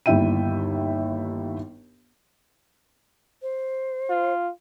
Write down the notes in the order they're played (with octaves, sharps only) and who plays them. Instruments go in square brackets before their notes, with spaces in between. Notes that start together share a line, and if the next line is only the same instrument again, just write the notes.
[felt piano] G1 D#2 E4 E5 G5 D#7
[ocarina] C5
[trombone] F4